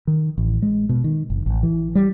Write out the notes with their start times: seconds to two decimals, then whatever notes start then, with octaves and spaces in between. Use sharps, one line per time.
0.07 D#3
0.38 A1
0.62 G#3
0.89 B2
1.04 D#3
1.30 F#1
1.46 A1
1.63 E3
1.95 G3